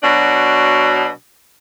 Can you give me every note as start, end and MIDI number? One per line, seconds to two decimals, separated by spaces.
0.01 1.09 47
0.01 1.09 54
0.01 1.09 62